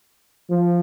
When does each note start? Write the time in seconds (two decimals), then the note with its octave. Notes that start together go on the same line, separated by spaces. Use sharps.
0.50 F3